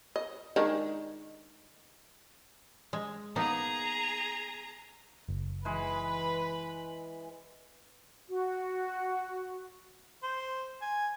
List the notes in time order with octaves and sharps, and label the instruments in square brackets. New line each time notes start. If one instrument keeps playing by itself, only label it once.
[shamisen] D#5
D#3 G#3 D4
[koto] G#3
[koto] A#3 B3 D#4 [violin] G#4 A#5
[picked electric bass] F#1
[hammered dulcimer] E3 G#3 [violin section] B4 B5
[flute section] F#4
[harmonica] C5
G#5